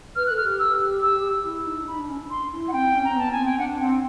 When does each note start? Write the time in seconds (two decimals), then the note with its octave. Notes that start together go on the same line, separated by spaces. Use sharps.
0.16 B4 F6
0.26 A4 F#6
0.37 F6
0.44 G4
0.59 E6
1.02 E6
1.44 E4
1.65 D#4
1.82 D4
1.87 D#4 B5
1.99 D4
2.09 C#4
2.19 D4
2.30 C6
2.52 E4
2.68 F#5
2.73 C4 G5
2.95 C#4
3.04 A#5
3.09 C4
3.16 B3 A5
3.31 G#5
3.37 C4
3.45 G5
3.58 D4 F#5
3.80 C4 G5